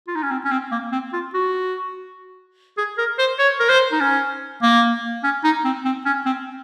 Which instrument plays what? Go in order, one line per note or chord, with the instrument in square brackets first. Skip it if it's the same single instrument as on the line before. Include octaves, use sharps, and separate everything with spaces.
[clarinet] F4
D#4
C#4
C4
C#4
C4
A#3
C4
F4
F#4
G#4
A#4
C5
C#5
A#4
C5
D#4
C#4
A#3
C#4
D#4
C4
C4
C#4
C4